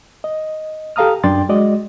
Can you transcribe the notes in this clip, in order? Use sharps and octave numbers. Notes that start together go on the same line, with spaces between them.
D#5
G4 A4 F5 A#5 D#6 F6
F#2 D4 D5 G5 C6 A6
G#3 F#4 D5 D#5